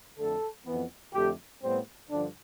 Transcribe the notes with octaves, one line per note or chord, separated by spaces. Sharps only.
F2 D3 A3 A4
F2 E3 B3
F2 D3 A3 G4
A2 G3 B3 C4
G2 D3 F3 D4